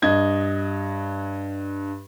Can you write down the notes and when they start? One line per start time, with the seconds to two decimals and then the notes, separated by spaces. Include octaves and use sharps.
0.02 G2 D#5 G#6